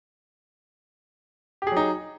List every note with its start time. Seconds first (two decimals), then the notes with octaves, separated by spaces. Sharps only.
1.62 G4
1.67 G#4
1.72 F#3
1.76 D#4